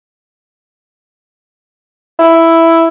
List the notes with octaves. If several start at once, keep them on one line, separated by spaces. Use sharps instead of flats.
E4